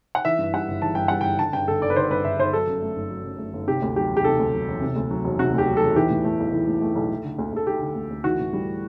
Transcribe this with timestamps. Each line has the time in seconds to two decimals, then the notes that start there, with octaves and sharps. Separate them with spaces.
0.15 F#5
0.25 E3 E5
0.39 G2
0.54 G3 F#5
0.68 G1
0.82 E3 A5
0.95 G2 G5
1.08 G3 F#5
1.21 G1 G5
1.39 D3 A5
1.53 G2 G5
1.68 G1 A4
1.82 G1 D5
1.90 B4
1.96 D3 C5
2.10 G2 B4
2.24 G1 E5
2.39 G1 C5
2.53 F#3 A4
2.67 F#2
2.82 A3
2.96 G1
3.10 F#3
3.24 F#2
3.38 A3
3.53 G1
3.67 C3 G4
3.82 D2
3.96 F#3 G4
4.10 E1
4.17 G4
4.24 C3 A4
4.39 D2
4.53 F#3
4.68 E1
4.81 C3
4.96 D2
5.11 F#3
5.24 E1
5.39 C3 F#4
5.53 D2 G4
5.68 F#3
5.77 A4
5.82 E1
5.96 E3 G4
6.10 A2
6.25 A3
6.39 B1
6.53 E3
6.67 A2
6.82 A3
6.95 B1
7.10 A3
7.24 D3
7.39 D2
7.53 D2 A4
7.67 A3 G4
7.81 D3
7.96 D2
8.11 D2
8.24 E3 F#4
8.39 A2
8.53 G3